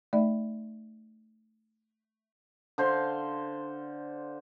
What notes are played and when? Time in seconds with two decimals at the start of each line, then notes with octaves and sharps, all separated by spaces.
0.13 A3 D#4 D5 E5 B5
2.78 D3 C5 F5 C6